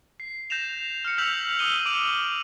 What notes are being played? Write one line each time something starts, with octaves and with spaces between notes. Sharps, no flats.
C7
G6 A#6 E7 F7
F6 C#7
E6 G6 B6 F7 F#7
D#6 E6 D#7 G7
D6 D7 D#7 F7 F#7